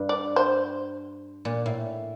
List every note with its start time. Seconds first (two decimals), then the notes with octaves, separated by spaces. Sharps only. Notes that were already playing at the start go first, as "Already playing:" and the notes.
Already playing: G2
0.09 D5
0.36 C5
1.45 A#2
1.66 A2